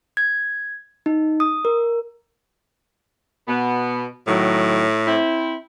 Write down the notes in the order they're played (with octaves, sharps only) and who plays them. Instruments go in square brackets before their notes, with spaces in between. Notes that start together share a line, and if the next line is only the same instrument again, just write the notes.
[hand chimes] G#6
D#4
D#6
A#4
[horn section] B2 B3
[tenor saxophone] A2 [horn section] D#3 F#3
[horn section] C4 E4